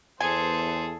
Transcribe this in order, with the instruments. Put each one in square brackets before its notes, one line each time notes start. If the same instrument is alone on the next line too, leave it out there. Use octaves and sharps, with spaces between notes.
[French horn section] E2 [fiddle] G#4 A4 [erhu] C5 [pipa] G#5